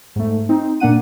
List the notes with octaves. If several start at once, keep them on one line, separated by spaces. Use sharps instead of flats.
G#2 A3
C4 D#4
A#2 A#3 D4 F#5 D#7